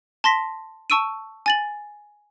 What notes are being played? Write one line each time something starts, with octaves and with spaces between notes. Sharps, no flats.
A5 C6 A#6 B6
A5 C#6 E6 D7 D#7
G#5 A6 F#7